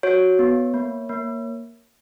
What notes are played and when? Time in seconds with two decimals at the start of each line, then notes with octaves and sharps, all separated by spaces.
0.03 F#4 C#5
0.39 B3
0.74 A#3
1.09 A#3